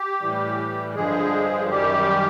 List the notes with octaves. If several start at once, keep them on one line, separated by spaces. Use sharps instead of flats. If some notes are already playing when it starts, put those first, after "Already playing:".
Already playing: G4
A2 E3 G3
G2 D3 F3 G#3 G#4
F#2 D#3 G3 G4